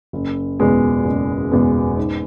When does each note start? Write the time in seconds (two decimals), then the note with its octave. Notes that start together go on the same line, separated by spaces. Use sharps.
0.13 F#1
0.59 E2 B2 G#3 B3
1.05 F#1
1.51 E2 B2 G#3 B3
1.97 G#2